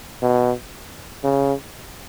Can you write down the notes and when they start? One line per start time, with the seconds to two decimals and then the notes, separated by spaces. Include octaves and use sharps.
0.22 B2
1.24 C#3